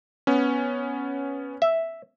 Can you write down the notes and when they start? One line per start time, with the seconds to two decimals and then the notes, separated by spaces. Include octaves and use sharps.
0.27 B3 C#4
1.62 E5